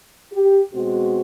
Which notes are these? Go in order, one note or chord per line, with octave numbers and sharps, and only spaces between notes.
G4
B2 G#3 C4 F#4